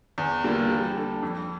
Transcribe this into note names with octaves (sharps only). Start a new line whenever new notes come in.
E2
D3 G3 A#3 F4
G3
D4 A4
F2